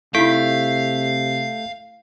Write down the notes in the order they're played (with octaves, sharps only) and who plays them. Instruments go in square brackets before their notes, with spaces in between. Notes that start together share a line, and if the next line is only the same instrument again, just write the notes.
[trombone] C3 [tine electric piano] A3 G6 B6 [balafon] D#4 E4 [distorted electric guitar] F5